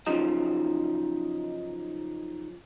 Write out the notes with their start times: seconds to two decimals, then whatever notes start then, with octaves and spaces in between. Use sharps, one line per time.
0.06 C#3 F3 F#3 D#4